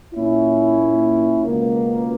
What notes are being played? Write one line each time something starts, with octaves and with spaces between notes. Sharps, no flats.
A#2 A#3 C#4 E4
C#2 B2 A#3